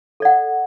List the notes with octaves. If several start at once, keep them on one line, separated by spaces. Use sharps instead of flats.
A4 D5 F#5